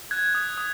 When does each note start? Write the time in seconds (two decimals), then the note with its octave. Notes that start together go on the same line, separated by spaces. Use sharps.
0.11 F#6 G#6
0.35 D#6
0.58 D#6